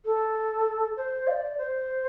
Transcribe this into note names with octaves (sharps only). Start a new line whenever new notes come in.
A4
C5
F5
D5
C5